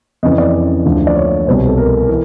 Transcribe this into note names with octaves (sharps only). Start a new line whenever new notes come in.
F2 C#3 E3 D#5
D5
D2 D3 F3
D5
C#5
C2 B2 C5
A4
A#4
E3